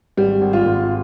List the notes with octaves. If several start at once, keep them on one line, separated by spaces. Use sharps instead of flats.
G#1 G3
G#1
F4
G#1